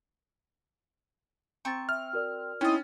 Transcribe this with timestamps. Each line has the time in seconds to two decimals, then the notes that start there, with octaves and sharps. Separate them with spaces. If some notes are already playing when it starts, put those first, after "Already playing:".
1.65 C4 A#5 C#6 A6
1.89 E5 F6
2.13 F#4 A#4 D5
2.61 C4 C#4 D#4 E4 D#5 G5 A6